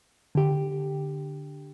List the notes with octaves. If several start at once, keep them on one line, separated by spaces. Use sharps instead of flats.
D3 G4